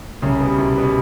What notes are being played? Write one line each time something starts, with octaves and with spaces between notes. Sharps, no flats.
C2 C#3 C#4
B2 G3
C2
B2 G3